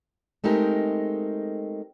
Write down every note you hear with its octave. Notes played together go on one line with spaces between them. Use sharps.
G#3 A3 C4 D#4 G4 A#4